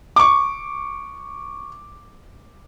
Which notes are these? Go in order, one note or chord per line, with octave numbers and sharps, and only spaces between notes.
C#6 D6